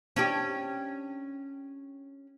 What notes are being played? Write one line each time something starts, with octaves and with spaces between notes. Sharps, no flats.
C#4 D4 G4